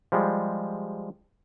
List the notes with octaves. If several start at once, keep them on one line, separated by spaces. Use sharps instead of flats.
F3 G3 G#3